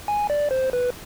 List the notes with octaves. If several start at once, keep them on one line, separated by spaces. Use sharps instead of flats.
G#5
D5
C5
B4